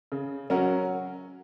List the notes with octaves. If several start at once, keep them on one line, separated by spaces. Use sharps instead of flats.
C#3
F#3 C#4 F#4 A#4